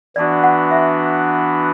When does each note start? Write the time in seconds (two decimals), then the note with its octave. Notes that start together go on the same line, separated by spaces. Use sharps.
0.16 E3 B3 D4 F#4 D5
0.43 F#5
0.71 E5